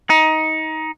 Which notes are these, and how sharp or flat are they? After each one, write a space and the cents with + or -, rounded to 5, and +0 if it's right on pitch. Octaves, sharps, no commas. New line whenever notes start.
D#4 +20